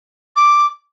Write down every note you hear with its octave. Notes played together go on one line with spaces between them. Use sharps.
D6